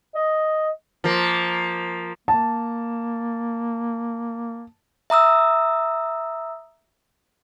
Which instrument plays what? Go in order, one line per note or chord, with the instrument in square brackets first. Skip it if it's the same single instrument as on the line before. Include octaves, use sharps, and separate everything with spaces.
[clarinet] D#5
[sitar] F3 A#3
[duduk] A#3 [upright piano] A5
[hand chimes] E5 A#5 D#6 E6